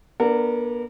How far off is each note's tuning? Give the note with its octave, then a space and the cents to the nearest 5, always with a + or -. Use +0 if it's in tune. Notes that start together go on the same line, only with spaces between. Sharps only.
B3 -45 D4 +0 A#4 -25